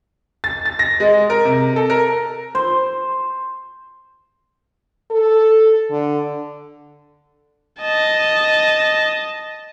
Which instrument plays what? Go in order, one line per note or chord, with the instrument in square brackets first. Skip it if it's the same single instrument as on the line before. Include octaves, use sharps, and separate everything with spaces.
[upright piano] A6
A6
A#6
G#3
A#4
C3
A4
A#4
[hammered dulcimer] C5
[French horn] A4
D3
[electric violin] D#5 A5